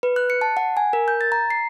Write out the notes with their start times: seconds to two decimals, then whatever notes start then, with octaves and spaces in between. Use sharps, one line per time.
0.03 B4
0.16 F#6
0.30 C#7
0.41 A5
0.57 F#5
0.77 G#5
0.93 A#4
1.08 G6
1.21 A6
1.32 A#5
1.50 C7